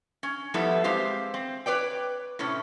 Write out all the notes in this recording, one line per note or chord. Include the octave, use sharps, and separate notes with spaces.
C#4
F3 G3 A3 B3 E4
G#3 C4 G4 C5 F5
C4
B4 C#5 D5 G5
A2 C3 C#4